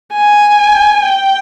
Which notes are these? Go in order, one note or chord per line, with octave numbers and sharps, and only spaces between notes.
G#5
G5